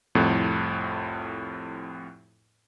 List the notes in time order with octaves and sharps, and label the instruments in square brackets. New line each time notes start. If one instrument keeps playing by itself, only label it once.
[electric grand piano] C2 F2 A2